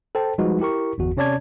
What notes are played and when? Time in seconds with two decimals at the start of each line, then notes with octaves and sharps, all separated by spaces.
0.15 A4 C5 G5 A5
0.38 F3 G3 G#3 D#4 F#4 B4
0.60 E4 G4 A#4 C#6
0.98 G1 E2 F#4
1.17 C3 C#4 C#5 D5 A5 G#6